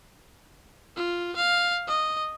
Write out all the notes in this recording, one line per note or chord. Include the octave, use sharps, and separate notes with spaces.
F4
F5
D#5